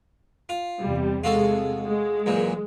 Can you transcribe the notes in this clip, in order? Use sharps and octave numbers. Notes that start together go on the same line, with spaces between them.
F4
E2 C3 G3
C3 G#3 F4 F#4 A4
G#3
F#2 A#2 E3